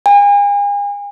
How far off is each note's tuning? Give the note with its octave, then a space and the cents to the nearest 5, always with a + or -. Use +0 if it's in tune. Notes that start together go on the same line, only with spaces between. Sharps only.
G#5 -40